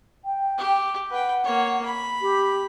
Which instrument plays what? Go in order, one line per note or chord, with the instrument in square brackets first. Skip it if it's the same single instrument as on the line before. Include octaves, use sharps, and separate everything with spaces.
[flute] G5
[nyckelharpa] G4
[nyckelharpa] B4 G5 [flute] F#5
[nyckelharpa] A#3 C#5
B5
[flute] G4